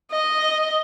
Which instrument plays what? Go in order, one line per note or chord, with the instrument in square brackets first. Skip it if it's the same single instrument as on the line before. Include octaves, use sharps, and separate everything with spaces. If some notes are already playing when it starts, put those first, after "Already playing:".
[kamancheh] D#5